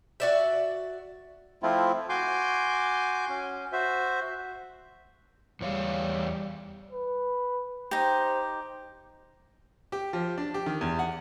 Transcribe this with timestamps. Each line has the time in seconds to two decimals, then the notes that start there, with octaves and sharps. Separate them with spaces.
0.20 F#4 D5 E5
1.63 F3 A3 C4 E4 F4
2.09 F#4 G#5 C6 D6 G6
3.29 C#4
3.72 F#4 C5 E5
5.61 E2 G3 C#5 F5
6.91 B4
7.91 D#4 G4 C5
9.92 G4
10.13 F3
10.38 D4
10.54 G4
10.66 D#3
10.81 E2
10.99 F#5